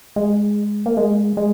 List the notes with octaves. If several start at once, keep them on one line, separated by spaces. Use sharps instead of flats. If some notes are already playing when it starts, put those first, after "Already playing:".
G#3
A#3
G#3
G#3